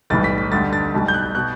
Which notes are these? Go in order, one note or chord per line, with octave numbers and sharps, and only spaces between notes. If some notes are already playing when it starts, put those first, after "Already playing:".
B1 A2 E3 G3 A6
B6
B6
D2 D3 G3 A6
A6
B1 B2 G3
G6
F#6
B2 F#6